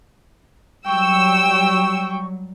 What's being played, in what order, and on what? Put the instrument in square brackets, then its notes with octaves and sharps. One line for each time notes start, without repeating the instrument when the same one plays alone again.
[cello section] F#3 G3 [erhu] G5 [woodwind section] C#6 [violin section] E6